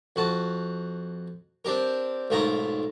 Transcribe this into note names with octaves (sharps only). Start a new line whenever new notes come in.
F2 F#4 A5
C4 D4 G4 A#4
B1 G#2 A3 F4 A#4 A#5